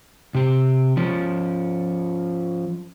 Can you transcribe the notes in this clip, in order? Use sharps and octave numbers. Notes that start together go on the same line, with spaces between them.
C3 G4
F3 C#4